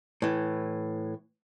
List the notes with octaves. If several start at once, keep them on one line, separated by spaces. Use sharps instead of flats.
A2 E3